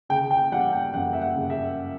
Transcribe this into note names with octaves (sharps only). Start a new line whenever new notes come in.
C#3 G5
G5
G3 F#5
G5
F#2 F#5
E5
F#5
C#3
E5